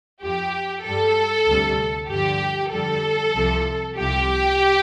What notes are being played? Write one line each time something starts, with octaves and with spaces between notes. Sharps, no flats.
F2 F3 G4
G2 A4
G3
D2 C3 G3
G2 D3 F3 G4
F2 D3 G3 A4
C2 C3 F3
C2 C3 F3 G4